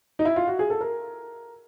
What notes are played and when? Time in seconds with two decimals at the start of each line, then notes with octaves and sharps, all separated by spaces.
0.19 D#4
0.25 E4
0.36 F4
0.47 F#4
0.59 G#4
0.70 A4
0.81 A#4